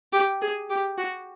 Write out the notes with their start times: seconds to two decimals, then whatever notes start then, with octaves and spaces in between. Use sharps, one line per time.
0.13 G4
0.42 G#4
0.70 G4
0.98 F#4